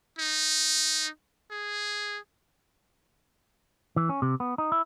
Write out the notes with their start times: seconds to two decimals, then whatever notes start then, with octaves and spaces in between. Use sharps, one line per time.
0.19 D#4
1.51 G#4
3.96 E3
4.09 C#4
4.22 C3
4.40 B3
4.58 D#4
4.72 E4